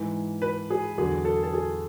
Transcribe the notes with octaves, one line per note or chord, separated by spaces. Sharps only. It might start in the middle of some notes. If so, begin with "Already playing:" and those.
Already playing: G#2 E3
B4
G#4
E2 D3 F#3 G#4
A4
A4
G#4